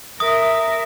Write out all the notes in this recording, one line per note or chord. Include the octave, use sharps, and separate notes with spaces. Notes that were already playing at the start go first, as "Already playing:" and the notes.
A#4 E5 D#6